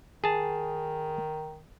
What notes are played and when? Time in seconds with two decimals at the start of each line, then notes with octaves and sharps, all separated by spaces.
0.24 D#3 G#4 A5